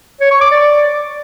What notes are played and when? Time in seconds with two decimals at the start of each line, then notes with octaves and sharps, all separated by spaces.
0.21 C#5
0.31 C#6
0.41 D6
0.51 D5